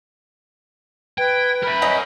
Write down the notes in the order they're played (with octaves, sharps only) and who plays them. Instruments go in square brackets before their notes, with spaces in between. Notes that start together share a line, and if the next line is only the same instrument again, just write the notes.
[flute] B4 [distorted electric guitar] G5 [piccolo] G#6
[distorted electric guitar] A#4 E5 [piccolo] B5
[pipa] F#3 D#5 [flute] G#5